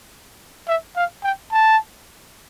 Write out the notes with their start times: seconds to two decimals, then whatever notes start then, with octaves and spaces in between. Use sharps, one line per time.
0.68 E5
0.96 F5
1.23 G5
1.52 A5